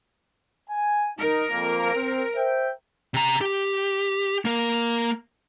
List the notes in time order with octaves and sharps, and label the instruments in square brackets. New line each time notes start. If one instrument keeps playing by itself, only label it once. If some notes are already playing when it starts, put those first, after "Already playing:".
[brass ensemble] G#5
[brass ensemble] D#4 [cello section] A#4
[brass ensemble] F2 A#3
C4
C5 E5 G5
[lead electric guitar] C3 A#5
G4
A#3 A#4